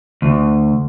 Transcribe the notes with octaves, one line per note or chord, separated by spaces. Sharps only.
D2